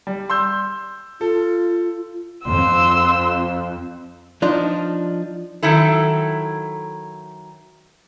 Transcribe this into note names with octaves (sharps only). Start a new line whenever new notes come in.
G3
C6 E6 G6
F4 A4
F2 C6 E6
F3 D4 D#4 F4
D#3 F#3 E4 A4